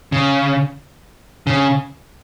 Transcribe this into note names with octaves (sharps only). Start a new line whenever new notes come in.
C#3
C#3